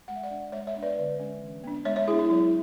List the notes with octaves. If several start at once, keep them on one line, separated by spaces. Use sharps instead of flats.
G#3 F#5
E5
D5 F#5
D4
G#3 C#5 E5
C#5 E5
B3 D4
B4 D5
D3
G#3 C#4
E3
B3 D4
G#3 C#5 E5
C#5 E5
B3 D4 E4 G#4
E4
F#3 E4